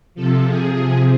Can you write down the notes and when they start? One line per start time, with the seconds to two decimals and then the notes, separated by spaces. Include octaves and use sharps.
0.15 C3 F3 A4
0.45 G#4